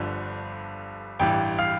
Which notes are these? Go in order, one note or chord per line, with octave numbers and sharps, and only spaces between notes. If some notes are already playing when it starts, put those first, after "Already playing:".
Already playing: G1 G2 D3 F3
A1 G2 E3 G5
F5